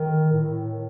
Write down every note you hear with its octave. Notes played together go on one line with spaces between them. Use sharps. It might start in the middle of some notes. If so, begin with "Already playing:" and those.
Already playing: D#3
A2